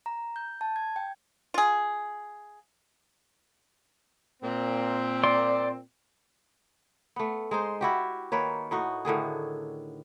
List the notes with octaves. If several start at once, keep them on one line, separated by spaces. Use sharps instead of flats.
A#5
G6
A5
G#6
G5
F4 G#4
A#2 C4
D5 C6
A3 B3
G#3 D#4 C5
E4 F#4 G4
D#3 A#3 B4 C#5
A2 D#4 F#4
A2 D3 D#3 G#4